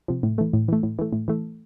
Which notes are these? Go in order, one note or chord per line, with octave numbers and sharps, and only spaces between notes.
C3 F3
A2
E3 A3
A2
E3 A3
A2
E3 A3
A2
E3 A3